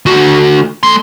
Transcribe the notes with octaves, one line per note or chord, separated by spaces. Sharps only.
D2 F#4
A3 C6